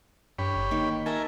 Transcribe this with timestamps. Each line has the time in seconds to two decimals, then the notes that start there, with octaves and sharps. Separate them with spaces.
0.39 G2 G4 C#5 B5
0.56 G1
0.71 D#3 A#3
1.06 A#4 D#5 E5 G#5 A5